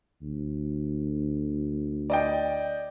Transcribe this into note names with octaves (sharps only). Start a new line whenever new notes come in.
D2
D5 D#5 G5